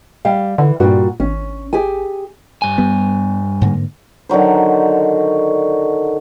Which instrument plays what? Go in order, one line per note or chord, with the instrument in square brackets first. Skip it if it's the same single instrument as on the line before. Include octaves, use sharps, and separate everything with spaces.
[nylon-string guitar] G3 G4 F5
[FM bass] D3 [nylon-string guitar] E3
[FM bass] G2 [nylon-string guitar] A#2 G3 F#4
[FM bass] G#1 [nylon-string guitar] C#4
[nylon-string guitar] G4 G#4 G#5
[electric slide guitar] G2 G#5
[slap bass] G3 B3
G#2 D3 A#3
[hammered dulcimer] D3 D#3 F#3 C5